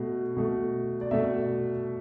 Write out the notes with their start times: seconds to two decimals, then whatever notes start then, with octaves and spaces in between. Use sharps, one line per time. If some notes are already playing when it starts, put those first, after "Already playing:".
Already playing: B2 A3
0.37 B2 A3
1.01 D5
1.11 B2 A3 E5